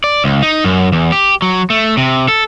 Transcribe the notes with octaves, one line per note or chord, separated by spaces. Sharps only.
D5
C#2
D#4
F#2
E2
G4
F#3
A3
C3
A4